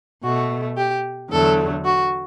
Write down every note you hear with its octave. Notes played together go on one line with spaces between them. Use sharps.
B2 A3 F#4
G4
E2 D3 F#3 A3 A4
F#4